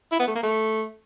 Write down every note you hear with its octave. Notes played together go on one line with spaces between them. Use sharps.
E4
B3
A3
A#3
A3